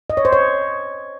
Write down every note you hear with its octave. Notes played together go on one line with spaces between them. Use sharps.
D#5
C#5
C5
C#5